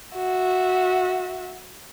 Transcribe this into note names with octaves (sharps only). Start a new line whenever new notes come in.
F#4 E5